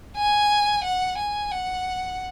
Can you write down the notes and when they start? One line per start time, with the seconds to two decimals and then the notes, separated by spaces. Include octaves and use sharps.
0.17 G#5
0.84 F#5
1.18 G#5
1.51 F#5